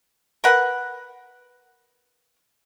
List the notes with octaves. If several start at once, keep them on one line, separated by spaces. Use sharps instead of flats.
A#4 B4 F#5